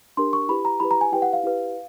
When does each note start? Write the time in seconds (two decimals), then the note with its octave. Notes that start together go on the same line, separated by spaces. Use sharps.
0.17 D4 G4 A#4 C6
0.33 C#6
0.49 E4 G4 B4 B5
0.65 A#5
0.80 E4 G4 B4 B5
0.91 A#5
1.01 G#5
1.12 E4 G4 B4 G5
1.22 F#5
1.33 F5
1.43 E4 G4 B4